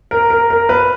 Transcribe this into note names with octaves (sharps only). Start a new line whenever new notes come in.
A#4
A#4
A#4
B4